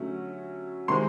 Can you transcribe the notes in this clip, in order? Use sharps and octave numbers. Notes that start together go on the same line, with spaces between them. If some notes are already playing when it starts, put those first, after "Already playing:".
Already playing: D3 F#3 A3 C#4
C3 D#3 G#3 C4 C6